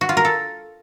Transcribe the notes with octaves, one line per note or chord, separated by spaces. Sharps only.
F#4
F4
A#4
A4